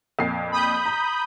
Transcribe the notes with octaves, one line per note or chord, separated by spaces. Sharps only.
F2 A#2 C7
B5 D#6 G6
A#5